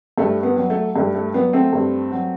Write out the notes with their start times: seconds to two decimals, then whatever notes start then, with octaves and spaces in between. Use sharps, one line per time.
0.18 G2 A3
0.43 B3
0.56 F#3
0.70 A3
0.96 G2 A3
1.15 A3
1.34 F#3 B3
1.53 A3 C4
1.73 G2
2.12 F#3